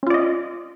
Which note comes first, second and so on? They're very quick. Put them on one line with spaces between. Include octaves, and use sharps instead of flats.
C#4 F4 D5 D#5